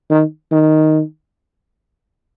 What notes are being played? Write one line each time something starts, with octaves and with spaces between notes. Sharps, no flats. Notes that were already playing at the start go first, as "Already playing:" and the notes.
D#3
D#3